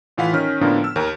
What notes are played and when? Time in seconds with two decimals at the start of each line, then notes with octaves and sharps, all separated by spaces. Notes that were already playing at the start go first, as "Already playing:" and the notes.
0.18 A2 E3 F4 F5 F#5 B6
0.33 D#3 C#4 F6
0.61 A2 D3 F3 A#3 B3 D4
0.84 E6
0.96 D#2 A#4